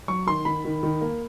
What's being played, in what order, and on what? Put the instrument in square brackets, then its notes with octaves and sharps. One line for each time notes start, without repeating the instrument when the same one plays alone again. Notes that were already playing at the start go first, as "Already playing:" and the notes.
[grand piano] F#3 [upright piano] C#6
[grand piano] D#3 [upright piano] C6
[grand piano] D#3 [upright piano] B5
[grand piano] D#3
D#3
A#3